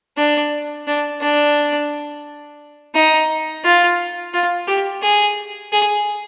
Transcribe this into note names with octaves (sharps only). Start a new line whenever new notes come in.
D4
D4
D4
D#4
F4
F4
G4
G#4
G#4